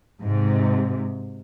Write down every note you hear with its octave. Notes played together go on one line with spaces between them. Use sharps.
G#2 C3